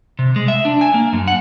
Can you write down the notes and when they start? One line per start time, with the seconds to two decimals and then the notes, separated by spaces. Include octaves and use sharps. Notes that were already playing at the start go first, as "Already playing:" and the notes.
0.19 C3
0.36 G#3
0.48 E5
0.65 D4
0.81 G#5
0.94 A#3
1.13 F#2
1.28 F#5